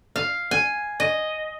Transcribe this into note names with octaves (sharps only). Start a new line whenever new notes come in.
F5
G#5
D#5